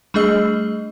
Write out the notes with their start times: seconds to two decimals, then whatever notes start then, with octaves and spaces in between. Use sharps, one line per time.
0.14 G3 A3 D4 G#4 D#5 E6